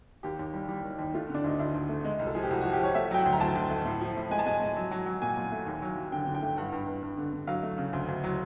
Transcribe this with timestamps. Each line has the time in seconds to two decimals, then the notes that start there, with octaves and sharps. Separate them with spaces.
0.23 D#2 G4
0.39 D#2
0.54 G3
0.69 G3
0.84 D#3
0.99 D#2
1.14 A3 F4
1.29 D3
1.34 D4
1.44 D2 D#4
1.59 D2 E4
1.74 D2
1.89 A3
2.04 G#3
2.19 C2
2.27 A4
2.35 F3 G#4
2.43 G4
2.51 C2 F#4
2.61 F3 F#4
2.72 G4
2.80 F3 C#5
2.95 A3 E5
3.11 F#3 G5
3.18 F#5
3.25 D2
3.33 A#5
3.40 D2 A5
3.55 D2
3.70 A3
3.85 A2
4.01 F3
4.17 A2
4.31 G#3 G#5
4.39 A5
4.46 G#3 G#5
4.61 G#3
4.76 F#3
4.91 F#3
5.06 F#3
5.22 A#2 G#5
5.37 A#2
5.52 A3
5.66 D#2
5.82 F#3
5.97 F#3
6.12 D3 G5
6.27 D3
6.35 G5
6.42 A3
6.57 G2 F#5
6.72 G2
6.87 G2
7.02 G2
7.17 D3
7.33 D3
7.47 F#3 F5
7.63 A3
7.78 C#3
7.93 D2
8.09 D2
8.24 F#3